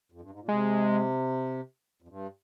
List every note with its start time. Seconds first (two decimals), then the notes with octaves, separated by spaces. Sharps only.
0.12 F2
0.22 G2
0.30 G#2
0.39 A#2
0.48 C3 G#3
2.02 F2
2.08 G2